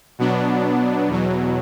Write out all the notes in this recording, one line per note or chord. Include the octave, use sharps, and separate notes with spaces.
B2 F#3 B3 D4
E2 B2 F#3